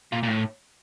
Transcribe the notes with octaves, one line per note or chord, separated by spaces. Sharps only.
A#2
A#2
A2